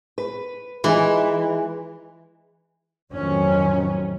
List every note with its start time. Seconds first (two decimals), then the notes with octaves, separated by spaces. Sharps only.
0.18 B4
0.84 E3 G#3 D#4 F4 G#4
3.12 F2 A2 D#3 F#3 C#4